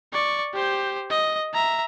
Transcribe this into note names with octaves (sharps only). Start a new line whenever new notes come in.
D5 C#6
G4 C5
D#5
E5 A#5